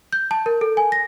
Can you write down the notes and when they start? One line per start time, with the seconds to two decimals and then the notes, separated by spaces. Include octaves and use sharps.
0.13 G6
0.31 A5
0.46 A#4
0.61 A4
0.77 G#5
0.92 A#6